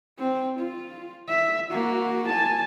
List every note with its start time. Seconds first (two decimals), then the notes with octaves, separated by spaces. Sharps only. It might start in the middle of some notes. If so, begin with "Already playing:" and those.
0.19 C4
0.60 F4
1.29 E5
1.71 A#3 F#4
2.29 G#5 A5